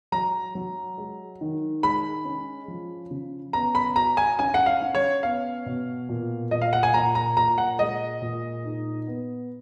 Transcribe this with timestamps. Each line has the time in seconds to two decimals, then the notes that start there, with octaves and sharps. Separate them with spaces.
0.12 F#3 A#5
0.55 F#3
0.98 G#3
1.41 D#3
1.83 G#3 B5
2.25 C#4
2.68 F3
3.11 C#3
3.53 B3 A#5
3.75 B5
3.96 F#4 A#5
4.17 G#5
4.39 C#4 G#5
4.54 F#5
4.66 F5
4.82 C#4
4.95 C#5
5.23 B3 F5
5.66 B2
6.09 A#2
6.51 A#2 D#5
6.61 F5
6.73 F#5
6.83 G#5
6.93 A#2 A#5
7.15 A#5
7.37 A#2 A#5
7.58 F#5
7.79 G#3 D#5
8.22 A#2
8.64 D#4
9.07 B3